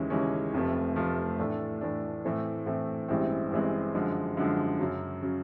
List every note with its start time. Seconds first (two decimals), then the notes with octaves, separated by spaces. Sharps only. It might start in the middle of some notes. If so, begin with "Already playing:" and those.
Already playing: D#2 C#3 E3 G#3 C#4
0.10 D#2 C#3 E3 G#3 C#4
0.53 F1 F2 C3 F3 A3
0.96 F1 F2 C3 F3 A3
1.39 A2 E3 A3 D4
1.81 A2 E3 A3 D4
2.24 A2 E3 A3 C4
2.66 A2 E3 A3 C4
3.09 A1 G2 E3 G#3 C4
3.51 A1 G2 E3 G#3 C4
3.94 F#2 D3 F3 G#3
4.37 F#2 D3 F3 G#3
4.80 F#2 C#3 F#3
5.22 C#3 F#3